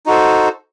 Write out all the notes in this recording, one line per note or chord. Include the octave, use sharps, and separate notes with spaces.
D#4 F#4 A4 C5